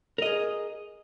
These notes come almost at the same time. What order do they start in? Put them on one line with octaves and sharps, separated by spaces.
A#4 D#5 G#4